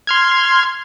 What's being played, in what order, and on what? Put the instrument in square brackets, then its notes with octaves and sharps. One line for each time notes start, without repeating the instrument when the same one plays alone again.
[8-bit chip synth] C6 F6 G#6